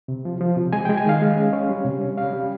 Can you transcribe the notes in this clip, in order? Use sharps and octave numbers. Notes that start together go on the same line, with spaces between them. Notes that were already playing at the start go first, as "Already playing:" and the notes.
C3
F3
F3
C3
G#3 G#5
G5
G#3
G#5
D#3 F5
G#3
C#4
C#4
G3
C3
C#4
G3 F5
G3